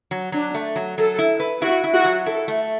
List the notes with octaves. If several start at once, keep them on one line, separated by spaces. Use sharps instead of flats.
F#3
F#3 D4
A3
F#3
F#3 A4
E4
B4
E4 F#4
E4
F#4
F#3
E4 A4
A3